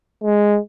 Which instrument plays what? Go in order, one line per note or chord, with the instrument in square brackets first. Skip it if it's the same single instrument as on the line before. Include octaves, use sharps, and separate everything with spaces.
[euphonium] G#3